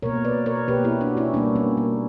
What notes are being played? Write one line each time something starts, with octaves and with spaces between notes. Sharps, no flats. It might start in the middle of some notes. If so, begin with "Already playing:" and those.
B2 A#3 A#4 C#5
B4 D5
A#4 C#5
B2 A#3 G4 B4
E4 G4
D4 F#4
C#4 E4
B2 G3 A#3 B3 D4
A#3 C#4
A#3